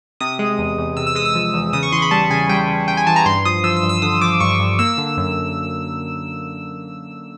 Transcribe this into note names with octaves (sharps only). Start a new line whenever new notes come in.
C3 D#6
G#3
E2
E2
C3 E6
E6
G#3 D#6
E6
F3
E2
C#3 D#6
C#6
E3 C6
B5
G3 A5
C#3 G#5
G3 G5
C#3
C#3 G5
G#5
E3 A5
A#5
G2 C6
F3 D#6
F3 E6
E6
G2
E6
D3 D#6
F3 D6
G2 C#6
G2
A#3 E6
D3
F#2